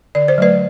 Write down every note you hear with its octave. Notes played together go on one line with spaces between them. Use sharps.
D3 D5
C5
F#3 A3 B4 D5